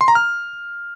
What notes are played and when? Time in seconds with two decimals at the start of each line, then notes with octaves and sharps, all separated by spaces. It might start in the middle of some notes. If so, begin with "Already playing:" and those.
0.01 C6
0.08 A#5
0.15 F6